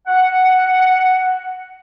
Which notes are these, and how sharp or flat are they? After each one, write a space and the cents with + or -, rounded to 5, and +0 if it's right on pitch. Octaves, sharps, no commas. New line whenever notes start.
F#5 +0